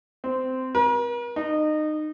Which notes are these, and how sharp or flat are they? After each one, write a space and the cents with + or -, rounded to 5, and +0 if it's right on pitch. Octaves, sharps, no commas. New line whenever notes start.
C4 -15
A#4 +45
D#4 -25